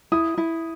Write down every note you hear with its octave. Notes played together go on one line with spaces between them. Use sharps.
E4 D#6
E4